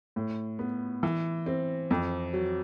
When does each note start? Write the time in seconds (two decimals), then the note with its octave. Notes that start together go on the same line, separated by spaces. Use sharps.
0.16 A2
0.59 B3
1.03 E3
1.46 C4
1.91 F2
2.33 F#3